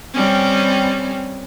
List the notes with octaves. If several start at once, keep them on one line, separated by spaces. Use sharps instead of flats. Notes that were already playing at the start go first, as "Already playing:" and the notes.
G3 C4 C#4